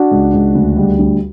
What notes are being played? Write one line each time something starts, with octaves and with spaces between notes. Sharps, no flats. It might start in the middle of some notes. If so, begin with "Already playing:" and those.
Already playing: D4 F#4
C#2
C#2
D2
G3
D2